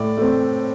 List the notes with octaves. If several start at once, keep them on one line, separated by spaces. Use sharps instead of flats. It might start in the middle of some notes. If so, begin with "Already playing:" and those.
Already playing: A2 D5
A3 C4